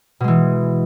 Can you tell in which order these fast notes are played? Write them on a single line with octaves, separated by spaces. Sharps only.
B2 G#3 E3